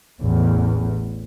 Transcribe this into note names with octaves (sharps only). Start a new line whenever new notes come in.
A1 E2